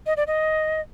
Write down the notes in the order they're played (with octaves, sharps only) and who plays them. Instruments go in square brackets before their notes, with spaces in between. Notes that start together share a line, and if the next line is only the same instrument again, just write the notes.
[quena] D#5
D5
D#5